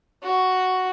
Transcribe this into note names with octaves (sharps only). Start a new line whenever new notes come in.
F#4